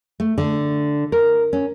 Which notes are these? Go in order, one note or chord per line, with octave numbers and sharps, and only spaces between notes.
A3
D3
A#4
C#4